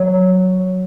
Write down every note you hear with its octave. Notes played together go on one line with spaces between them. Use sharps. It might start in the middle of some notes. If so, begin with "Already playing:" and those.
Already playing: F#3